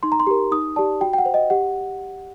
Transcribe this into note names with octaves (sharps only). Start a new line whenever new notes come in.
D#4 C6
A#5
C6
G4 A#4
D#4 D#6
G4 D5 A5
F#4 G5
G5
F#5
C5
D#5
G4 F#5